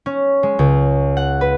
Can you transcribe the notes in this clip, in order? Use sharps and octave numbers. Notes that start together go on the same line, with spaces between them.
C#4
G#3
C#2
F#5
B4